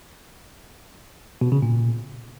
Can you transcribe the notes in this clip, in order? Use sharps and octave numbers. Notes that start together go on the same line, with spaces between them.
B2
C#3
A#2